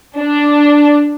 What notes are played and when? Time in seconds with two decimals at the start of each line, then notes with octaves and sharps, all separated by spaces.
0.18 D4